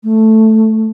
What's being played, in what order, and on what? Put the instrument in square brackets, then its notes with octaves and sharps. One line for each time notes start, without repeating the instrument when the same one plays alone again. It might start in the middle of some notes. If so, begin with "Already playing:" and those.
[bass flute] A3